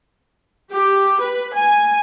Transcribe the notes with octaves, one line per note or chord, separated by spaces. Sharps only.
G4
B4
G#5